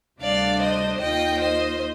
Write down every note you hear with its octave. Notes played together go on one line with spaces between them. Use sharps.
D2 C3 G3 D4 D5 F5
C5 D#5
D#2 D#3 A#3 F4 D#5 G5
C5 D#5